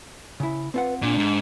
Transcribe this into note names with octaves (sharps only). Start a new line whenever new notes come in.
C#3 E4
C4 F4 B4 F#5
A#2 D4
G#2